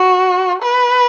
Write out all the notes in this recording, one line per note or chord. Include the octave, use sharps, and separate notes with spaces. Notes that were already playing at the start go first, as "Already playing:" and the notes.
Already playing: F#4
B4